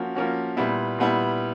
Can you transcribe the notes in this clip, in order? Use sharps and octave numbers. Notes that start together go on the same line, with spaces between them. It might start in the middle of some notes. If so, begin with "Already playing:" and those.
Already playing: F3 A#3 C#4 F#4
F3 A#3 C#4 F#4
A#2 G3 B3 E4
A#2 G3 B3 E4